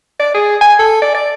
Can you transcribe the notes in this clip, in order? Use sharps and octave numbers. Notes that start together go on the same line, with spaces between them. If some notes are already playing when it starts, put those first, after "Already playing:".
D5
G#4
G#5
A4
D5
D5